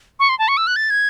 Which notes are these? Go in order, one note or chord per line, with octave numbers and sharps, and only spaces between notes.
C#6
C6
A5
C#6
E6
F#6
A6
G#6